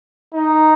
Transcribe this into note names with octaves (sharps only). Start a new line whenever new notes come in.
D#4